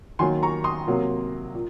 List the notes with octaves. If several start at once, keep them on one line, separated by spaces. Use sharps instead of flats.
D#3 F#3 A#3 G#5 C6
A#5 C#6
C6 D#6
C3 F#3 A#3
A#2